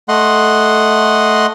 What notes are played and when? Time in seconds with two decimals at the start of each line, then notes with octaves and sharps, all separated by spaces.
0.09 A3 D#5 F#5 C6